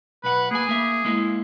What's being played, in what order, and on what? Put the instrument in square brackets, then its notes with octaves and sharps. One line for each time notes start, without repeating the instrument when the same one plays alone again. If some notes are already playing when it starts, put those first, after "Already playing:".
[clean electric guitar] B1 F#5 [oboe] B4
[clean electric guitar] A#3 G#5 [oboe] G#4
[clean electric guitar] A#3 E5
G#3 A#3 E4